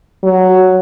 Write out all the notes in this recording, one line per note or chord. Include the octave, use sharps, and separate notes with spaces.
F#3